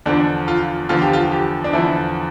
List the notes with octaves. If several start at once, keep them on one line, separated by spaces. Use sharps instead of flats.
E2 D3 F3 D4
F4
E2 D3 F3 F4
G4
F4
G4
D4
E2 D3 F3 E4